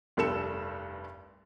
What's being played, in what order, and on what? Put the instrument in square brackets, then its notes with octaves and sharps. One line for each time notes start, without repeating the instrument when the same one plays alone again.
[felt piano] F1 C2 G2 A4 C#7 E7